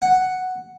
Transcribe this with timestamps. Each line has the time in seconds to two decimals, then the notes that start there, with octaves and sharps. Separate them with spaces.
0.02 F#5